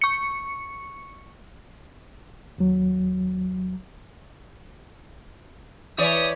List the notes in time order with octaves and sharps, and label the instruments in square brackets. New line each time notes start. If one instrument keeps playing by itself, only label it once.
[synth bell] C#6 C#7
[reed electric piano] D#2 F#3
[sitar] E3 C#5 D5 [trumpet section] G4 B5 D#6